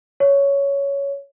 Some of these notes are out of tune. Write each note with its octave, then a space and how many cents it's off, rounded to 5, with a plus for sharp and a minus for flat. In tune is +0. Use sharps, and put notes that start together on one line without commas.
C#5 +10